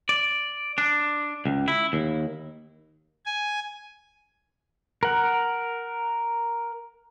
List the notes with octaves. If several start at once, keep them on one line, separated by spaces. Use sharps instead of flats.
D5
D4
C#2
E4
D#2
G#5
A#4 F#5